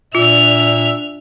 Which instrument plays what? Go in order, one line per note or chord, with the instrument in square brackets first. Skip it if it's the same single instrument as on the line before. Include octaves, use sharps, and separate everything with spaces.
[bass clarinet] A#2 [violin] D4 F7 [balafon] F4 [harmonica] E5